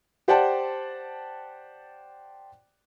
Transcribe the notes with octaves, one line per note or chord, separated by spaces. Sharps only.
G4 C5 D5 F#5 G5 A5